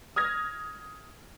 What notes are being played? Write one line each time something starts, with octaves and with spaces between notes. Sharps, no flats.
D#6 F6 G#6 A#6